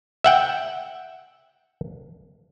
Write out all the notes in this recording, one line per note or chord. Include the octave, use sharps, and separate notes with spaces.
E5 F#5 G5